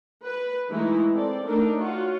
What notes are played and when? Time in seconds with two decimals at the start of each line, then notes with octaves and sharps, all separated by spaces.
0.23 B4
0.68 E3 G#3 A3 D#4 E4
1.13 C4 A4 D5
1.45 A3 D4 D#4 A4 A#4
1.75 F4 F#4 C#5